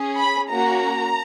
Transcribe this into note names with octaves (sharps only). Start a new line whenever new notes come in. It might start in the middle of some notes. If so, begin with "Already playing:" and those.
Already playing: C#4 G#4
B5
A#3 C#4 F#4 A#5